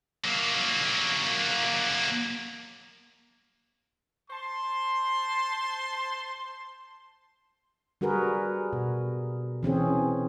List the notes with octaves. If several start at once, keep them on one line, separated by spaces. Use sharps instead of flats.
F#3 A#3
C5 A5 C6
G3 F#4 G#4 A#4 B4
B2
E3 C4 C#4 G#4